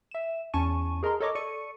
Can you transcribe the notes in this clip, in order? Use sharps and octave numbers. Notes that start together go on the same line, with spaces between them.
E5 E7
E2 C#4 G#5 A5 C#6 D#7
G#4 A#4 D#5 A#5 C6
A4 A#4 C#5 D#5 C#6 D6
A4 D5 C#6 C#7 D#7